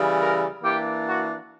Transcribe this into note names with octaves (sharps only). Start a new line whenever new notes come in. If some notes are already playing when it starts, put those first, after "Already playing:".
Already playing: C#3 E3 G3
A#4
E3 A#3 D4 G4
F#4